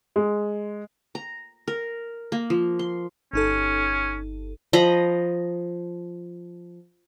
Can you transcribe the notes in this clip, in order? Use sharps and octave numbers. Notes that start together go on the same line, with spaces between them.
G#3
A#5
A#4
A#3
F3
C6
G1 C#4 D#4 A4
F3 D#5 A#5 B5